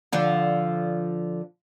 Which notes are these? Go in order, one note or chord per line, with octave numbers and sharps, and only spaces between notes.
D3 F3